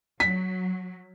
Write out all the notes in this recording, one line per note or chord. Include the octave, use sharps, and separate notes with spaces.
F#3 B6